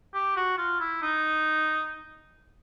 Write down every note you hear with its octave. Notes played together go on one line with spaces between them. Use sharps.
G4
F#4
F4
E4
D#4